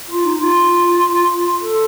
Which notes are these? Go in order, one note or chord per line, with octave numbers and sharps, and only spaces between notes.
F4
D#4
F4
A4